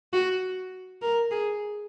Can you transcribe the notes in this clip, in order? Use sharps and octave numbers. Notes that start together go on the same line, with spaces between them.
F#4
A#4
G#4